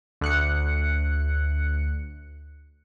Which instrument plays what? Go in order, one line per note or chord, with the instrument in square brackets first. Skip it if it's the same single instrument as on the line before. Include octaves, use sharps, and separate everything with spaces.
[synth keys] D2 F#6 C#7